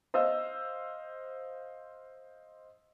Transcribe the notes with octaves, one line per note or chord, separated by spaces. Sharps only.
C5 D#5 F5 E6